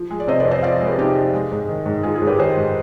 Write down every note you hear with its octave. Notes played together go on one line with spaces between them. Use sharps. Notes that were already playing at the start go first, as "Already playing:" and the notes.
Already playing: F3
G#3
D5
C3 C5 D#5
B4 D5
F2
C5 D#5
F3 D5 F5
G#3
G4 B4
C3 D#4 G4
F2
G#3
G#2
D#3
G#2
G#3 F4 G#4
F4 G#4
G#2
G4 B4
D#3 G#4 C5
G#2